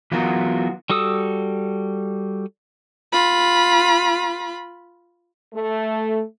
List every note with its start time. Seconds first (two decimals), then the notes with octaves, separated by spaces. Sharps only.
0.12 E3 F#3 B3 F4 F#4 A#4
0.90 G3 F#4 A4 D#6 E6
3.12 F4 B5
5.54 A3